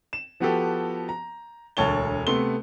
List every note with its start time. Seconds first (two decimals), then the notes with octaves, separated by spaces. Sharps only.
0.13 E7
0.40 F3 B3 F#4 G4 A4
1.09 A#5
1.77 E1 D2 C#5 A5 G7
2.27 C3 A3 B3 C6 G7